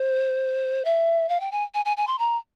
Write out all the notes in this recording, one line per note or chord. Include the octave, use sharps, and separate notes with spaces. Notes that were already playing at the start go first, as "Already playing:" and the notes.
Already playing: C5
E5
F5
G5
G#5
G#5
G#5
G#5
C6
A#5